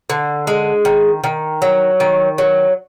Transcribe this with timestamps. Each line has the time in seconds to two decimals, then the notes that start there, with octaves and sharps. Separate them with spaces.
0.10 D3
0.47 G#3
0.85 D#3
1.24 D#3
1.62 F#3
2.00 D#3
2.38 F#3